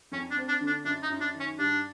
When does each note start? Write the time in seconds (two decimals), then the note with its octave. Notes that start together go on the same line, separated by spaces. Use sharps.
0.12 F2 C#4
0.31 D4
0.37 C4
0.48 D4
0.61 D3
0.67 D4
0.84 F#2 D4
1.03 D#4
1.10 F#2
1.21 D4
1.34 D#3
1.40 C#4
1.59 G2 D4